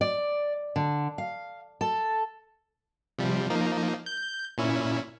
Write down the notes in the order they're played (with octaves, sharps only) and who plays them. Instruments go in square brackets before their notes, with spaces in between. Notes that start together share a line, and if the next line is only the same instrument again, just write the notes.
[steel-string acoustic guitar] D5
D3
F5
A4
[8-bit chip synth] C3 F3 G3
F3 A#3 D#4
G6
A#2 C#4 E4